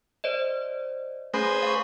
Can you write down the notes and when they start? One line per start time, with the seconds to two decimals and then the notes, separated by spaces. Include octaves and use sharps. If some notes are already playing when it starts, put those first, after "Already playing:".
0.24 C5 D5 D#5
1.34 A3 C#4 G#4 B4 C5
1.63 F5 C#6